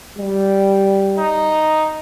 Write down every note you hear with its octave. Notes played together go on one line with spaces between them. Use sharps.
G3
D#4